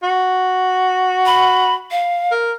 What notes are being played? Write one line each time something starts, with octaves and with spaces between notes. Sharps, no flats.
F#4
B5
F5
A#4